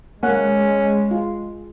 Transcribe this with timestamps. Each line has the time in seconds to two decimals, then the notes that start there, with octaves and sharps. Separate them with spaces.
0.23 G#3 A#3 C#4 F#5
1.11 F4